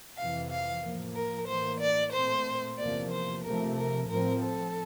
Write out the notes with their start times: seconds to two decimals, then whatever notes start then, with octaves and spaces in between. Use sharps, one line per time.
0.17 F2 C3 E3 F5
0.50 F5
0.82 A2 F3 A#3
1.15 A#4
1.47 A2 E3 A#3 C5
1.80 D5
2.12 A#2 A3 C4 C5
2.77 E2 C3 F3 A#3 D5
3.11 C5
3.44 C3 F3 A3 A#4
3.77 A#4
4.08 A2 F3 C4 A#4
4.42 A4